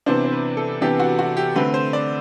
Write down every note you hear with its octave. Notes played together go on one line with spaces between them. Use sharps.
C3 E3 B3 D4 C5
C5
B4
A4
C3 E3 B3 D4 G4
F#4
F#4
G4
D3 A3 C4 B4
C5
D5